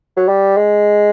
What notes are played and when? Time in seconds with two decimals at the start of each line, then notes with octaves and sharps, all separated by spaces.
0.17 F#3
0.28 G3
0.57 G#3